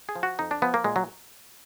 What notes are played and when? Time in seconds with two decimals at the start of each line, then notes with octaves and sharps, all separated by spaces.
0.09 G#4
0.15 F3
0.23 F#4
0.39 F2 D#4
0.51 D4
0.62 F3 B3
0.74 A#3
0.84 A#2 G#3
0.96 F#3